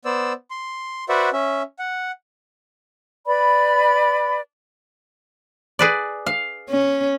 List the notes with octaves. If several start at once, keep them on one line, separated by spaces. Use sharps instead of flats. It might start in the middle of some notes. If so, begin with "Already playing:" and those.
B3 C5 D5 E6
C6
F#4 B4 C5 D5 E5 F#5
C#4 E5
F#5
B4 D5 B5
G#4 B4 D5
F5
C#4